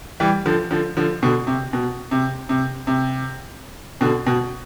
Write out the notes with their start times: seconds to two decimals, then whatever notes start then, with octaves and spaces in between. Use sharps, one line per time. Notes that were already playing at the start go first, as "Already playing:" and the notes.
0.20 E3 G3
0.46 D3 F3
0.71 D3 F3
0.97 D3 F3
1.23 B2 D3
1.47 C3
1.73 B2
2.11 C3
2.49 C3
2.87 C3
4.01 B2 D3
4.26 B2